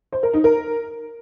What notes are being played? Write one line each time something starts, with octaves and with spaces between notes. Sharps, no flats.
C5
A#4
D#4
A#4